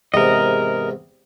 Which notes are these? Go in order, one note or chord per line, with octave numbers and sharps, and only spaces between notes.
E2 G#2 C3 A#4 D#5